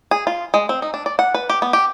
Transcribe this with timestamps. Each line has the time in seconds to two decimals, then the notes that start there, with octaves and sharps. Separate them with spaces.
0.11 G#4
0.27 F4
0.54 G#3
0.69 C4
0.82 D#4
0.94 D4
1.06 D5
1.19 F#5
1.34 B4
1.49 G4
1.62 B3
1.73 G4